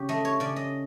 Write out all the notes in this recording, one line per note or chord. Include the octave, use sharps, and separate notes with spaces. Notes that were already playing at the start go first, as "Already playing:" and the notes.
Already playing: C#3 F#3 G4
A3 D#5
C#5
C#3 D5
D#5